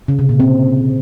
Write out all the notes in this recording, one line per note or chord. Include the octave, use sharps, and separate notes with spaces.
C#3
C3
A#2
C4